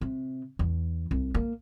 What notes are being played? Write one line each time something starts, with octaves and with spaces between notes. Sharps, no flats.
C3
E2
C2
A#3